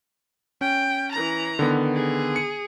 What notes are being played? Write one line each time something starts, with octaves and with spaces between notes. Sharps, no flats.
C#4 G5
E3 A#5
D3 D#3 B3
G#4
C#7